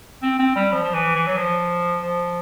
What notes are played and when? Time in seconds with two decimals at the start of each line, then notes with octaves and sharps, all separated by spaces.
0.23 C4
0.39 C4
0.56 G3
0.72 F3
0.83 F3
0.94 E3
1.15 E3
1.26 F#3
1.37 F3
2.03 F3